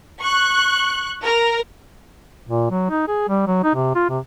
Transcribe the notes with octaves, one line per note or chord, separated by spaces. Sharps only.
C#6 F#6
A#4
A#2
F#3
D#4
G#4
G3
F#3
D#4
C3
F4
C3